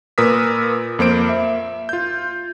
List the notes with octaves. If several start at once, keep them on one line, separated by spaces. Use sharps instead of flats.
A#2 A#4 B4 D#6 E6 B6
F2 A#3 C5 D7
E5
F4 G6